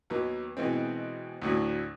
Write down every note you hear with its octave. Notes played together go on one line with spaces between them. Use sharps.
D#2 F#3 B3
B2 E3 G#3 C4
D2 A2 F#3